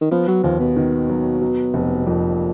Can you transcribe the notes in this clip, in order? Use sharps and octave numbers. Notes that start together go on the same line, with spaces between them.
D#3
F3 B3
F#3
D#2 F3
B2
D#3
F#3
F#3
F1
F2 A#2